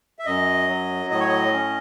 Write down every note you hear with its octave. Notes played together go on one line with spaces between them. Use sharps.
E5
F#2 D#5
F#3
A2 D#5
C#5
D#5
C#4